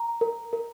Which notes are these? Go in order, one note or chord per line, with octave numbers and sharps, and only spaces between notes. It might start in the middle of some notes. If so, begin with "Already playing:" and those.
Already playing: A#5
A#4
A#4